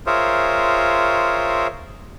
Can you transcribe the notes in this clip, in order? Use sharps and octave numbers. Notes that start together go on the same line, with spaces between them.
F4 G#4 A#4 C5 C#5 E5